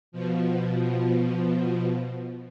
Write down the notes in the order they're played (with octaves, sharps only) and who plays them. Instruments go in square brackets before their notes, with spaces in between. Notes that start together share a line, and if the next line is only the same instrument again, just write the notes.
[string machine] B2 F3